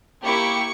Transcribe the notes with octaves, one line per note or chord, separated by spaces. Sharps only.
A#3 E4 G4 C#6